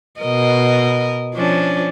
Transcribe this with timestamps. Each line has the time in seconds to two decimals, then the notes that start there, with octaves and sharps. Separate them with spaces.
0.20 B2 A#4 D#5
1.35 F3 C#4 D4